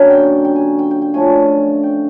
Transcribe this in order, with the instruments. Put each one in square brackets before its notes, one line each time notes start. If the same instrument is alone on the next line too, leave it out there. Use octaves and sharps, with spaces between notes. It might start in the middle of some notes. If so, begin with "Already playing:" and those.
Already playing: [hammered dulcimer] D3 F#3 A#3 C#4
G5
G5
G#5
G5
G5
G5
D3 F3 A3 C#4 G#5
G5